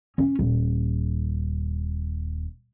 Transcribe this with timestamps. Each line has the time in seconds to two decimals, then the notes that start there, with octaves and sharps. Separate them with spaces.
0.18 C#4
0.39 D#1